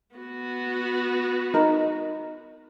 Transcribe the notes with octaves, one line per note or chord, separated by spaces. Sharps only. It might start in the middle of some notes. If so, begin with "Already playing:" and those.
B3 F#4
D#4 A#4